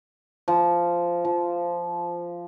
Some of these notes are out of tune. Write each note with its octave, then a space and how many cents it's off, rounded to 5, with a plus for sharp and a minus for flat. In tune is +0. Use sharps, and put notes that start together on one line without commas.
F3 -10
F3 -5